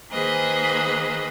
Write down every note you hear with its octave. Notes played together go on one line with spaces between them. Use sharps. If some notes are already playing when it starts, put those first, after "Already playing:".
D#3 A#3 G#4 B4 C5 D#5